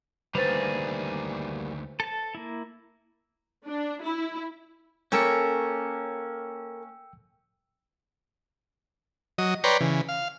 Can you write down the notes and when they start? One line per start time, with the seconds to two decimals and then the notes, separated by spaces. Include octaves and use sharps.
0.35 D2 D#3 G3 A#3 G#4 B4 C5 A6
2.00 A4 A5
2.35 A#3 E4
3.65 D4
4.03 E4
5.12 A#3 C#4 A4 A#4 C#5 G5 E6 C#7
9.38 F#3 D#5
9.64 B4 C#5 D5 G5 A#5 C6
9.81 C#3 E3
10.09 F5